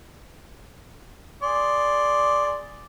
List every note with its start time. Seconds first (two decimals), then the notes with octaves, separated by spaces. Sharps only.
1.43 G#4 D5 C6